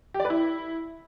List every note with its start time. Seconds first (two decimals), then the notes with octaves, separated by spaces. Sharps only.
0.14 G4
0.20 D5
0.25 B4
0.30 E4